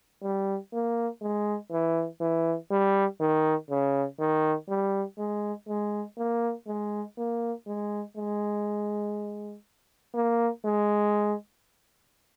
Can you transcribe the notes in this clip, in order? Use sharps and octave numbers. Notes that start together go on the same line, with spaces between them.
G3
A#3
G#3
E3
E3
G3
D#3
C#3
D#3
G3
G#3
G#3
A#3
G#3
A#3
G#3
G#3
A#3
G#3